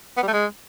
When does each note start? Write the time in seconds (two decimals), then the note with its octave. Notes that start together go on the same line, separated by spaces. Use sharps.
0.17 B3
0.22 G3
0.28 A3
0.33 G#3